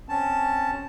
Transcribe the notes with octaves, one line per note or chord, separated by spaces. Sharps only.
C4 C#4 A5